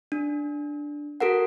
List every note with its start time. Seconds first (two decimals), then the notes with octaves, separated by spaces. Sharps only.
0.12 D4
1.20 F#4 A4 A#4 F#5